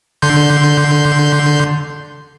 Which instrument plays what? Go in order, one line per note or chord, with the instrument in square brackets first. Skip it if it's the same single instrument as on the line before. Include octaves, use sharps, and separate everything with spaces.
[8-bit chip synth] D3 C6 G6